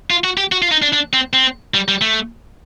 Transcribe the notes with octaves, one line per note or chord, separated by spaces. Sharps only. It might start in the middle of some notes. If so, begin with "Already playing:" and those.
F4
F#4
G4
F#4
F4
D#4
D4
D4
C4
C4
G3
G3
A3